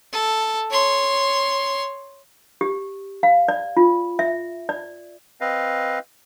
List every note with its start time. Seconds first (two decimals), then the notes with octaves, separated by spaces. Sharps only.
0.13 A4
0.70 C#5 C6
2.61 G4
3.23 F5
3.48 D5
3.77 F4
4.19 E5
4.69 D5
5.41 C4 B4 D#5 F5